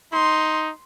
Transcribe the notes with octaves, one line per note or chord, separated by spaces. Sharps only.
D#4 C6